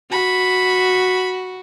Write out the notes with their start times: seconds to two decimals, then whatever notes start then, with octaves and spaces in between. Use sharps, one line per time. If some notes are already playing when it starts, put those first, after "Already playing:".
0.11 F#4 B5